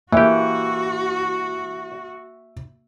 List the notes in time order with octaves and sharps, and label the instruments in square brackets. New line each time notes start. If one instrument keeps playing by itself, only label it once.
[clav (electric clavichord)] E3 G4 [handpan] A#3 [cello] F#4 [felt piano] E5